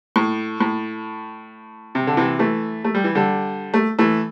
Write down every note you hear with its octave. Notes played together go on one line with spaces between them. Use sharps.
A2
A2
C3
D3
C3 E3
E3 A3
A3
G3
E3
D3 G3
A3
E3 A3